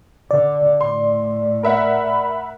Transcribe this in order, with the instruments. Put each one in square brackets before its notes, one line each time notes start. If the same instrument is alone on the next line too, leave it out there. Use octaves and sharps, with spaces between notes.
[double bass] D3 [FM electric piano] D5
[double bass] A2 [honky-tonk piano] C6
[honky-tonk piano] A#4 E5 F#5 [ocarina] B5